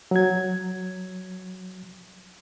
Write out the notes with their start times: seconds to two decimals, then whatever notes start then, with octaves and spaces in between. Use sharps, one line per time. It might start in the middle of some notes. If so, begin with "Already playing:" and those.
0.11 F#3 G#6